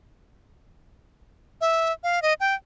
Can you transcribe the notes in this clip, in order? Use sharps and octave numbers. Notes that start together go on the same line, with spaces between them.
E5
F5
D#5
G5